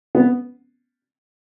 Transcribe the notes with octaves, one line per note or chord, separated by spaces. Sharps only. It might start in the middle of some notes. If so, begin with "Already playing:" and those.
B3